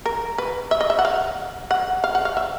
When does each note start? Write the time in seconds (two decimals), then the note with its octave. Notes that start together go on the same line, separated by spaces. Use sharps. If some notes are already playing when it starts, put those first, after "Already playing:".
0.06 A#4
0.38 B4
0.71 E5
0.81 D#5
0.90 E5
0.99 F#5
1.05 F5
1.71 F#5
2.04 F5
2.15 F#5
2.25 F5
2.37 E5